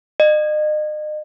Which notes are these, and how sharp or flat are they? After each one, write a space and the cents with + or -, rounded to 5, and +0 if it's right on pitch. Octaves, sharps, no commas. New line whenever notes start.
D#5 -40